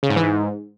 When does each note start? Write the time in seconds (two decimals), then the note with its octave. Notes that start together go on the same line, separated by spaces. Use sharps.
0.03 C#3
0.10 G#2
0.16 E3
0.23 G#2